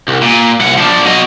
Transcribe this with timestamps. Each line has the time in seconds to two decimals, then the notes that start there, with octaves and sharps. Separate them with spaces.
0.08 C2
0.23 A#2
0.61 C2 F#5
0.78 F3 D4
1.06 F#3 D#5